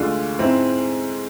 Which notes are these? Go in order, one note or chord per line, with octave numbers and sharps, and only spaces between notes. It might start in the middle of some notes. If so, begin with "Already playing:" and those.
Already playing: D2 D3 G#3 D4 F4
G#2 G#3 C4 E4